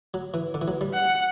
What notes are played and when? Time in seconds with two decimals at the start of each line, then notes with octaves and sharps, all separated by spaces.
0.14 F#3
0.34 E3
0.54 D3
0.61 E3
0.68 F#3
0.81 G3
0.94 F#5